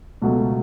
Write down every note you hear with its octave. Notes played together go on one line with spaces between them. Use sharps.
C#2 B2 F#3 A3